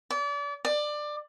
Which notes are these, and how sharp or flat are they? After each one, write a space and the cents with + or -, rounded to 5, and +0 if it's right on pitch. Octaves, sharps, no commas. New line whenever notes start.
D5 -35
D5 +20